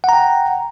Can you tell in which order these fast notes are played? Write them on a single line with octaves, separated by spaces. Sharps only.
F#5 A#5 G5